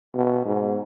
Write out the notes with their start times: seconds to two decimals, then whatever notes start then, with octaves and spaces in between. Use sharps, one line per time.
0.14 B2
0.46 G#2